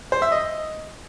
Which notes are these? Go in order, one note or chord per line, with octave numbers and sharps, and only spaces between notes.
C5
E5
D#5